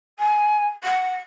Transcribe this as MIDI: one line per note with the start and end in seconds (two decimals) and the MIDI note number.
0.19 0.68 80
0.83 1.15 78